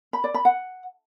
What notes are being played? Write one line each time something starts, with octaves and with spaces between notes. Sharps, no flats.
B5
D5
B5
F#5